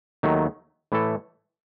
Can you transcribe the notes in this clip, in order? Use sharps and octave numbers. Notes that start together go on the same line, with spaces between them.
D#2 D#3 F#3 A3
A2 E3 A3 E4 A4